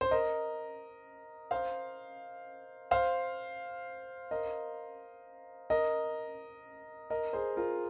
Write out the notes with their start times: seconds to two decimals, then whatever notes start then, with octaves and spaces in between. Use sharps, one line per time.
0.01 C5
0.11 A#4 D#5
1.51 C5 F5
2.91 C5 F5
4.31 A#4 D#5
5.70 A#4 D#5
7.10 A#4 D#5
7.33 G#4 C5
7.56 F4 A#4